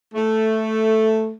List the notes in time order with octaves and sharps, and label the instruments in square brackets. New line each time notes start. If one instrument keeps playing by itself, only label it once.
[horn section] A3